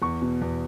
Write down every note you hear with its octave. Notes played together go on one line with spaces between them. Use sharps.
E2 C#6
B2
E2